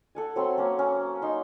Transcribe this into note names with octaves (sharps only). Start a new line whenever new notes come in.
A4 F#5 G#5
F#3 C4 B5 C6
A#3 C#4
C#4
D#4 C6